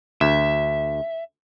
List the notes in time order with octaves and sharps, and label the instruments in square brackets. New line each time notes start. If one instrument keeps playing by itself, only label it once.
[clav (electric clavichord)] D2 [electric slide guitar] E5